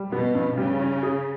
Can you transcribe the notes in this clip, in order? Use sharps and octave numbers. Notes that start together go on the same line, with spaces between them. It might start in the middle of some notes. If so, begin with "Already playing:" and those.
Already playing: G3
B2 B3
G2
C#3 G3
C#4
G#4